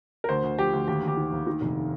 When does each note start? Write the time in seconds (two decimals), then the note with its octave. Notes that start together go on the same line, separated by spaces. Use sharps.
0.24 A#4
0.29 D2 C5
0.44 D2
0.59 F3 G4
0.73 D2
0.88 D#2 G4
1.03 D#2 G4
1.17 D#3
1.32 D#2
1.47 D#3
1.61 F1